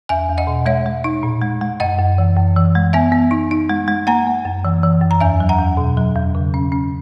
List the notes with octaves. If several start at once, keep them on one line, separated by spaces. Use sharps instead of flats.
E2 E5 G#5
E2
D#5 F#5
B2
G#3 C#5 E5
G#3
D#4
A#2
G#3
G#3
F#2 D#5 F#5
F#2
E3
F#2
E3
G#3
B3 E5 G#5
B3
D#4
D#4
G#3
G#3
A#3 F#5 A#5
A#3
F#2
E3
E3
F#2
A#5
E2 E5 G#5
F#3
F#5 A#5
E2
B2
F#3
E2
C#3
C#4
C#4